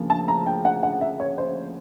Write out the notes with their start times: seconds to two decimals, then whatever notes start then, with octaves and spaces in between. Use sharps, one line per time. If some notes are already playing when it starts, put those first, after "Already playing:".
Already playing: D2 C#3 F3 A#3
0.10 A5
0.28 A#5
0.46 G5
0.65 F#5
0.83 F#5
1.01 E5
1.20 C#5
1.38 C5